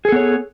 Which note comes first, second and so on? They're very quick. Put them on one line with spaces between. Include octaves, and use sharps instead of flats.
G#4 A4 B3 C#5